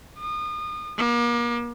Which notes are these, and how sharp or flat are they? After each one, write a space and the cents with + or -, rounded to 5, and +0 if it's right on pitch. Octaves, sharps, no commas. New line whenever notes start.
D#6 -30
A#3 +35